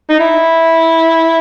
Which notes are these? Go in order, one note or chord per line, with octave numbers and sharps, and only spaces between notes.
D#4
E4